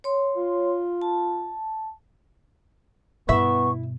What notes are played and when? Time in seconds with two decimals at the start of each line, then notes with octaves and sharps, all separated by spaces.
0.04 C#5 C6
0.36 F4
1.02 A5
3.29 G2 B2 B3 E4 E5 C#6